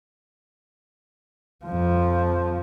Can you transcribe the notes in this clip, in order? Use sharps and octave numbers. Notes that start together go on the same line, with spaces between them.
F2 F3